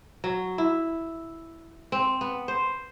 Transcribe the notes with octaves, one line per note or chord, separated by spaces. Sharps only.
F#3
E4
C4
B3
C5